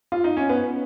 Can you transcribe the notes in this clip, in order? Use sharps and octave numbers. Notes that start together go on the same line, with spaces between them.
F4
D#4
C#4
B3